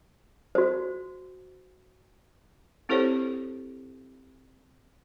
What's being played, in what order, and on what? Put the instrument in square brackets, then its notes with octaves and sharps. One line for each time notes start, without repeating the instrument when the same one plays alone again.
[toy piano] F#4 C5
[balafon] C4 E4 G4 A4 C5 C#5